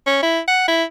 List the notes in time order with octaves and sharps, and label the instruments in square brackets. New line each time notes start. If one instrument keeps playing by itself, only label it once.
[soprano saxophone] C#4
E4
F#5
E4